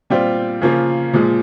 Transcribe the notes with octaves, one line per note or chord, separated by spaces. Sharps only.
A#2 G3 C4 F4
C#3 F3 A#3 F4
A#2 F3 G#3